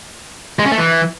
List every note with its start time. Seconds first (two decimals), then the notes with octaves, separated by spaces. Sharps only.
0.59 G#3
0.65 C#4
0.72 A3
0.78 E3